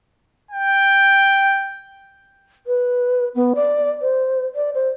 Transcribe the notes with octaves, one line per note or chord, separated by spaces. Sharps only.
G5
B4
B3
D5
C5
D5
C5